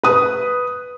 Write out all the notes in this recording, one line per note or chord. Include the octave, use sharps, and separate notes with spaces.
B4 D#6